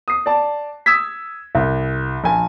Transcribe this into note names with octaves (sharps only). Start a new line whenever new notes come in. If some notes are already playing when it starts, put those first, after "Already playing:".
D#6 C7
D5 A5
D#6 E6 G#6 B6
C2
A#1 G#5